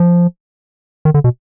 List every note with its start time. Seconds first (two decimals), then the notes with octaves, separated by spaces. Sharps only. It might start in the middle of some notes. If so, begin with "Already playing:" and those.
Already playing: F3
1.05 D#3
1.14 D3
1.24 B2